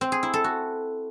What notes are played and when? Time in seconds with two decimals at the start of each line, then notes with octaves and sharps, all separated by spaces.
0.01 C4
0.12 G#4
0.23 E4
0.34 A4
0.44 F#4